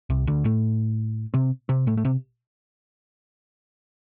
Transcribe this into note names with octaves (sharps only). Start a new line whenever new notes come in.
C2 C3
D2 D3
A2 A3
C3 C4
C3 C4
A2 A3
A3
C3 C4